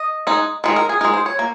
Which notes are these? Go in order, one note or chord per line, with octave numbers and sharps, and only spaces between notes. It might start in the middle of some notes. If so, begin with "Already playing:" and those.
Already playing: D#5
G#3 D#4
D#3 G#3 D#4
A#4
G#4
G#3 D#4 A#4
C5
C#5
A#3